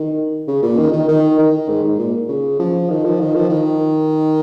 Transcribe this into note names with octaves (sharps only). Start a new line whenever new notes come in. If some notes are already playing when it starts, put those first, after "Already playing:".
Already playing: D#3
C#3
A#2
D#3
D#3
D#3
D#3
G#2
G#2
A#2
C#3
F3
D#3
F3
D#3
F3
D#3